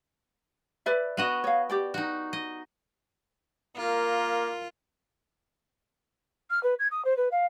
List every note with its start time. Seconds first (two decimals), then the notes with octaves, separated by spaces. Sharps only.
0.86 B4 D5 E5
1.17 B3 F#4 D#5
1.44 C#5 F5
1.70 G4 D5 G5
1.94 D#4 F#4
2.33 D#5
3.77 A#3 F4 A#4
6.50 F6
6.63 B4
6.79 G#6
6.91 D#6
7.05 C5
7.17 B4
7.31 F5